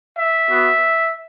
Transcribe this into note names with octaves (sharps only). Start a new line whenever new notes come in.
E5
B3 F#4